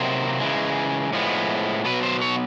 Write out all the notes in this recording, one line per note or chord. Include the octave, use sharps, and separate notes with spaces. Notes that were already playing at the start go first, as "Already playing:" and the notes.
Already playing: C3 D#3 F#3 A#3 C5
C#3 E3 G#3
A2 F3 G#3 B3
B2 F#3 B3 B4
C5
C#5